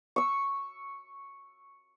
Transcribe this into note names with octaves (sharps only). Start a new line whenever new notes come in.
C#6 E6